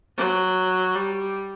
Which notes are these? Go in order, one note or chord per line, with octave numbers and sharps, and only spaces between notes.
F#3
G3